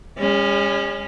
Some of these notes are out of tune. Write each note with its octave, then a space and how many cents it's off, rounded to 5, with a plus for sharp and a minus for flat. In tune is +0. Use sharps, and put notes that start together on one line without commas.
G#3 -45 C#4 +0